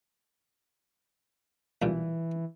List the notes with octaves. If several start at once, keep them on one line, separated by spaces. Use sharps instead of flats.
B1 G2 A#2 E3